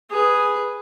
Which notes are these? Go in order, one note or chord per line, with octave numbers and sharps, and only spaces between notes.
G#4 B4